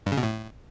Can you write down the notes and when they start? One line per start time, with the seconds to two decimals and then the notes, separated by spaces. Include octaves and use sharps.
0.06 G2
0.12 C#3
0.17 B2
0.23 A2